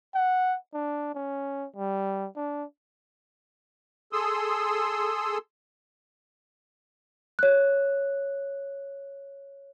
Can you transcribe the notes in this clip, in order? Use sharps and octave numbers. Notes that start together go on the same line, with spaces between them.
F#5
D4
C#4
G3
D4
G#4 A4 C6 D#6 E6
C#5 F#6